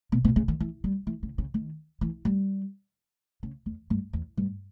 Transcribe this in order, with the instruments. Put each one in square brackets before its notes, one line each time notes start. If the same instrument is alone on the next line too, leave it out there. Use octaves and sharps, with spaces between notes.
[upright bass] B2
B2
C#3
D#3
E3
G3
E3
C#3
C#3
D#3
E3
G3
C#3
E2
G2
E2
G2